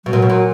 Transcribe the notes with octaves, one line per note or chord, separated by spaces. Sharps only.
B2 F#3
A#2
B2
A#2